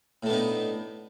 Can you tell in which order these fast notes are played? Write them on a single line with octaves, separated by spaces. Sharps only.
A2 D4 B3 D#4